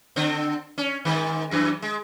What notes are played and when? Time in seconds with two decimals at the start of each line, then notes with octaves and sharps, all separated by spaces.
0.16 D3 C4
0.78 C#4
1.05 G#2 D#3
1.51 F#2 E3
1.82 G#3